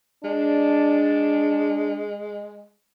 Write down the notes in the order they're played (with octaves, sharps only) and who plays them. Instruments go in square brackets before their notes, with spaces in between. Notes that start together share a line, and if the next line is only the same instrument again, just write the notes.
[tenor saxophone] G#3 [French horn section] D4